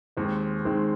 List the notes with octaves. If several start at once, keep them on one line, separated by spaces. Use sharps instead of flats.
D#2 D#3 G#3 C4
D#2 D#3 G#3 C4